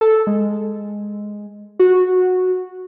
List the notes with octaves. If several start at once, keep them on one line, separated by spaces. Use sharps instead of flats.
A4
G#3
F#4